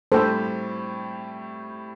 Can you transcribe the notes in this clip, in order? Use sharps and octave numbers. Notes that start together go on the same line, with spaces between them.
A2 G3 C4 G4 A4 C5